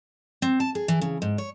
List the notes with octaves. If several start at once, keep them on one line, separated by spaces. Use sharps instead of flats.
C4
A5
G#4
E3
C#3
G#2
C#5